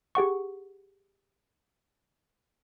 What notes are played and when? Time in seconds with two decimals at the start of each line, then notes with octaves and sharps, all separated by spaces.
0.15 G4 G#4 F#5 C#6